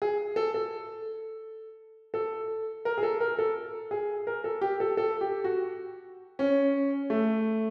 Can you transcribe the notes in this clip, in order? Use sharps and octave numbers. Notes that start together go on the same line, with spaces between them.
G#4
A4
A4
A4
A#4
G#4
A4
A#4
A4
G#4
A#4
A4
G4
A4
A4
G4
F#4
C#4
A3